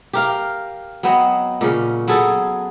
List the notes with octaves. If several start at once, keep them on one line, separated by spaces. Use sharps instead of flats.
G4 A#4 F5
F#3 B3 C4 D#5
A#2 C#3 C#4
F#3 B3 G#4 A4